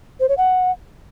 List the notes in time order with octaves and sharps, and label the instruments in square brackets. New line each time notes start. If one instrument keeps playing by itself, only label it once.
[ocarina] C5
C#5
F#5